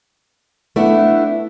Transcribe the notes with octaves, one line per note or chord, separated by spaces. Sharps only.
A3 B3 D4 E4